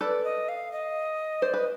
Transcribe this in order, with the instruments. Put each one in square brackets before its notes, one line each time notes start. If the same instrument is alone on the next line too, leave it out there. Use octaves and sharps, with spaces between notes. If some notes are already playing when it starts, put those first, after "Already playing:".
[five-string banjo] A4 B4 [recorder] D5
[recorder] D#5
F5
D#5
[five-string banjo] C5 [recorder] D5
[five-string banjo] B4 [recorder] D#5